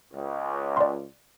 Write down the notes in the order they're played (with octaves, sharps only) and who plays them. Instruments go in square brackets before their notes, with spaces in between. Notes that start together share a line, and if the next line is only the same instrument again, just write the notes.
[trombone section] C#2
[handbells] D5 C6